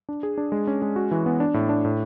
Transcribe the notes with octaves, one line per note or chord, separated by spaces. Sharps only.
D4
G#4
D4
G#3
C#4
G#3
F#4
E3
B3
D4
A2
D4
A2